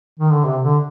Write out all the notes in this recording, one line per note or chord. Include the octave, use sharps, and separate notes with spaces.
D#3
D3
C3
D3